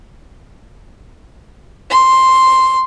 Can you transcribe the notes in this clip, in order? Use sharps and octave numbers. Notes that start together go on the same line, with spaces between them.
C6